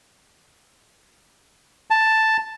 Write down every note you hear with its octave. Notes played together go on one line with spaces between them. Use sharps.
A5